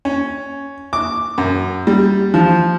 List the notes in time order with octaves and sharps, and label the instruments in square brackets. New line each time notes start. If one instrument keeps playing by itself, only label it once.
[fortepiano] C#4
D6
F#2
G3
F3